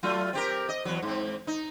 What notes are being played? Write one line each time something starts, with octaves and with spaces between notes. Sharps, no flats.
F#3 A3 F4
C4 G4 A#4
D#5
E2 F#3
G#2 C4
D#4